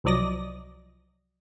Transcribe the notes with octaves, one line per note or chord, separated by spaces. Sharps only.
C2 F3 F#3 D5 D#5 A#6